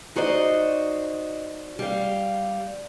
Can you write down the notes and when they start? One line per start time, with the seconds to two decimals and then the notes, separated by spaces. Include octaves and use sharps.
0.16 D#4 F#4 C5 D5 D#5
1.79 G3 F5